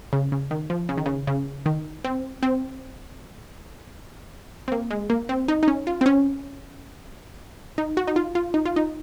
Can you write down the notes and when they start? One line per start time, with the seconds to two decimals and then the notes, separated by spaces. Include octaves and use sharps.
0.13 C#3
0.32 C#3
0.51 D#3
0.70 F3
0.89 C#3
0.98 D#3
1.06 C#3
1.27 C#3
1.66 D#3
2.04 C4
2.43 C4
4.68 C4
4.72 A#3
4.91 G#3
5.10 A#3
5.29 C4
5.48 D#4
5.63 D#4
5.68 C#4
5.87 F4
6.01 C4
6.06 C#4
7.78 D#4
7.97 F#4
8.07 D#4
8.16 F4
8.35 F4
8.54 D#4
8.66 F4
8.76 D#4